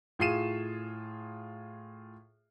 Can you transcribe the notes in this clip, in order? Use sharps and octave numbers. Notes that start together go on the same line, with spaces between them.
A2 F4 G#4 C7 D#7 E7